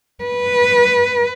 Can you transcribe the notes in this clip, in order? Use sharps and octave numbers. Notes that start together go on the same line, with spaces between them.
B4